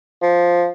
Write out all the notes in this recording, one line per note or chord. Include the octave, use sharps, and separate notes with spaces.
F3